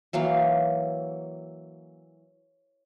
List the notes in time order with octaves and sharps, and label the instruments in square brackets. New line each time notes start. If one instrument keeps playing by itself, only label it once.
[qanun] E3 F#3 A#3 F5